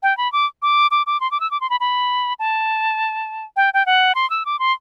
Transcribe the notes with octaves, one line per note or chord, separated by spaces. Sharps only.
G5
B5
D6
D6
D6
D6
C6
D6
E6
D6
C6
B5
B5
A5
G5
G5
F#5
C6
E6
D6
C6